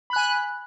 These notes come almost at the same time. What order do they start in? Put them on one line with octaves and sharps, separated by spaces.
B5 F#6 G#5